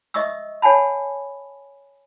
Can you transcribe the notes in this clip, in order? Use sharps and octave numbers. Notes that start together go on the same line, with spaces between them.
D#5 E5 C#6 D#6 E6
C#5 F#5 G#5 A5 B5